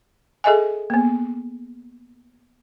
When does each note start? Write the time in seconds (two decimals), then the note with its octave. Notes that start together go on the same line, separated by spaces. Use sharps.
0.44 G#4 A4 D#5 E5 G#5
0.90 A#3 B3